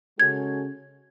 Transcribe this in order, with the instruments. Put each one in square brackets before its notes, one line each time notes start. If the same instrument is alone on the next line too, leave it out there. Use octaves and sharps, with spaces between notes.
[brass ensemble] C#3 G#3 C#4 F#4 A4 [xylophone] G#6